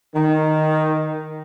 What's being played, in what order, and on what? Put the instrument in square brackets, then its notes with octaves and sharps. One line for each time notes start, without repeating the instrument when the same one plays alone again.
[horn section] D#3